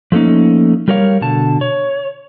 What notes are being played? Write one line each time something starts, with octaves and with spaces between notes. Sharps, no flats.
F3 A3 A#3 C#4 D#4
G3 G4 A#4 C#5 F5
B2 D3 A5
C#5